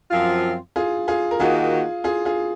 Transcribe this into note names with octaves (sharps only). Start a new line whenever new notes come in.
F#2 F3 C4 F4
F4 G#4
F4 G#4
A#4
D#3 A#3 D#4 F4 F#4 G#4
F4 G#4
F4 G#4